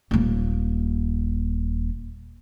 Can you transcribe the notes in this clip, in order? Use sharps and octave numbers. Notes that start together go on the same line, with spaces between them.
D#1 A#3